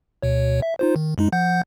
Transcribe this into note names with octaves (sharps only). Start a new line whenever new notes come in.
D2 B2 C#5
E5
D#4 F4 C5
D#3
F#2 G#3 D#4
F3 F#5 G6